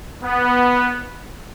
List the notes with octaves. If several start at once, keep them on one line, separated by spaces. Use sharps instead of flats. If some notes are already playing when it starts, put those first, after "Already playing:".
B3